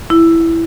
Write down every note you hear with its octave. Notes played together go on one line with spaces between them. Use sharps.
E4